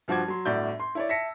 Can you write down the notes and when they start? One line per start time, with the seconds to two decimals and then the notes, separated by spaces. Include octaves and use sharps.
0.08 G2 F3 F#4 D6 G#6
0.28 F#3 C6
0.45 G1 A2 F#4 D5 G6
0.80 C6
0.95 E4 C#5 D5
1.09 E5 A5 E6 A#6 B6 C#7